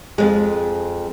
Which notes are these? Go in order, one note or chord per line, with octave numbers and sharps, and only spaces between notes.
F2 G#3